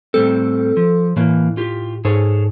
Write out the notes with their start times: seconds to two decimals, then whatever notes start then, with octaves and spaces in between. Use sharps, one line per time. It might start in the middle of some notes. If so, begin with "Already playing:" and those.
0.14 A2 G3 C4 A4
0.77 F3
1.17 A2 E3 A#3
1.57 F4 G4
2.05 G#2 G#4 A4 C#5